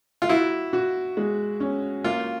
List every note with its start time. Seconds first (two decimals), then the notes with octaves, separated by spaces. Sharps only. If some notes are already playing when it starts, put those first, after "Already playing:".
0.22 F4
0.29 E4 F#4
0.73 F#4
1.17 G#3
1.60 C#4
2.04 A#3 F4